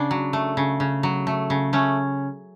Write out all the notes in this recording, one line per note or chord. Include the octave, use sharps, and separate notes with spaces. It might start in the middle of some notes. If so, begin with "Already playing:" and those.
Already playing: C#3 D4
F#3
A3
C#3
C#3
F#3
A3
C#3
A3 C#4